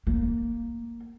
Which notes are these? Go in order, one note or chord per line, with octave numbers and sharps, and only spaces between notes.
A#3